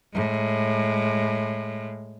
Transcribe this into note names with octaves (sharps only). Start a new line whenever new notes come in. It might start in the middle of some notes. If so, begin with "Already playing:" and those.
A2 G#3